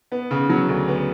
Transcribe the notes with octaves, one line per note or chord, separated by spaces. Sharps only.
B3
C#3
F#3
D2
B3